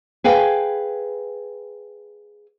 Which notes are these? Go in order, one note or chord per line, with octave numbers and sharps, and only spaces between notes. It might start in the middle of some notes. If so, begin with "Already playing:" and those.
G#4 B4 F5 G5 G#5